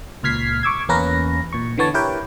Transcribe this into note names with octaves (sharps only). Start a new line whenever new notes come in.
C#2 A#2 F6 G#6 B6 C7
C#6 D6 E6 G#6
E2 A#3 C#4 A#4 B4 A#6
A#2 C#6
D3 E3 B3 C#5 A5
E4 G4 A#4 B4 C#5 G5